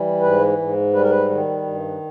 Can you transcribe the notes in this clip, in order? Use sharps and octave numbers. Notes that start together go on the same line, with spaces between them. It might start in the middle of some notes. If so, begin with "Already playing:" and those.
Already playing: E3 G3
G#2 B4
G#2
G3 B4
A#4
B4
D#3
G2